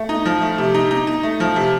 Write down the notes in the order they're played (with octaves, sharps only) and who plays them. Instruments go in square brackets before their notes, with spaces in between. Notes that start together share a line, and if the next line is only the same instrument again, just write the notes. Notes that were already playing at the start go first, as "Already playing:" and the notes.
Already playing: [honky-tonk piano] A3
D#4
F3
A3
C3
D#4
D#4
D#4
A3
F3
C3